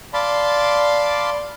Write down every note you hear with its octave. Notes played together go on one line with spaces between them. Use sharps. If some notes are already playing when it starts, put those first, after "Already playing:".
D5 F5 A5 B5 C6